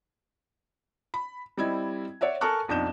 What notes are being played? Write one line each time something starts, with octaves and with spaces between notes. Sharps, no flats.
B5
G3 C4 E4 D#5 G#6
C#5 D5 E5 F#5
A4 A#4 G#5 A5 C#6 F#6
B1 F2 D4 D#4 G6 E7